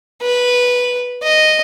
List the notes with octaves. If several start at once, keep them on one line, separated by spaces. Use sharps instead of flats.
B4
D#5